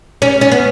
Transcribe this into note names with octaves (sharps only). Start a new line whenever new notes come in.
C#4
C#4
B3